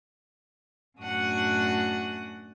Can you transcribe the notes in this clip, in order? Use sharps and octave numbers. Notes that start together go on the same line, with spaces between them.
F#2 A2 D4 F#4 F#5 D#6